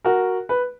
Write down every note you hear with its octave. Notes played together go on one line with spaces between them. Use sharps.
F#4 A#4
B4